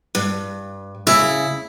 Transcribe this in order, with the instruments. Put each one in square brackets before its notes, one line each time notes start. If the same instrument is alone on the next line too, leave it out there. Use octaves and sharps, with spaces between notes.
[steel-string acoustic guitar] G2
[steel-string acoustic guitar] C#3 [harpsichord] E4